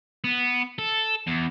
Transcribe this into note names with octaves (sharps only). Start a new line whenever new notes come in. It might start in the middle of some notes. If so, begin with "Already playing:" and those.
B3
A4
E2